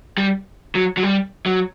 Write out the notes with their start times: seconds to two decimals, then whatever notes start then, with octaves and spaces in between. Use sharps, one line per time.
0.18 G3
0.75 F#3
0.97 F#3
1.03 G3
1.46 F#3